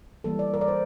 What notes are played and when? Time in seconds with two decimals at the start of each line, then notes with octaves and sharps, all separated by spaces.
0.24 E3 G3 A#3 A4
0.39 D5
0.54 A#4
0.61 D5
0.68 C5